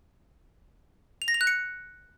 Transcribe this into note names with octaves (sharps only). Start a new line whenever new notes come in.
F7
A#6
F7
F#6
C#7